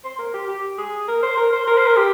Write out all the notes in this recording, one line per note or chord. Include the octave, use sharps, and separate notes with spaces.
C5
A#4
G4
G4
G#4
A#4
C5
A#4
C5
A#4
C5
A#4
G4